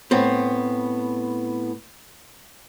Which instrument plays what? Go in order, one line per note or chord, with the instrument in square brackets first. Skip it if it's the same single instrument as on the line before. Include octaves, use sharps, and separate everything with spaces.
[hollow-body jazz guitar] A2 B3 C4